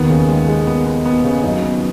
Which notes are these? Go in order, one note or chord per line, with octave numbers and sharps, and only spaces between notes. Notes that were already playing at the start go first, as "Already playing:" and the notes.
Already playing: D#2 D#3 B3
C#3
G#3
G#3
B3
B3
B3
C#3
F#2 F#3 D#4
B3